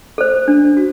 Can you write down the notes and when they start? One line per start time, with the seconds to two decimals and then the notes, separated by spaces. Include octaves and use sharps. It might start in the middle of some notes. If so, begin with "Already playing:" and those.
0.18 A4 C5
0.48 D4
0.77 F#4